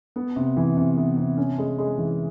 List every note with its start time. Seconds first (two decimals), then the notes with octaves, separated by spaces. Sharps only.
0.16 B3
0.36 C3
0.57 E3
0.77 C3
0.97 B3
1.17 C3
1.37 C#4
1.58 G#3
1.78 G#3
1.98 E3